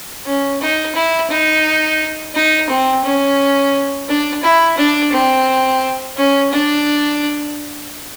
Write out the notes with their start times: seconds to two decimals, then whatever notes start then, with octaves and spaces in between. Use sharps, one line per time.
0.26 C#4
0.61 D#4
0.95 E4
1.30 D#4
2.35 D#4
2.69 C4
3.04 C#4
4.09 D4
4.43 E4
4.78 D4
5.13 C4
6.17 C#4
6.52 D4